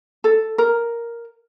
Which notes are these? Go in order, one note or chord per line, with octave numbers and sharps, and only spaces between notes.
A4
A#4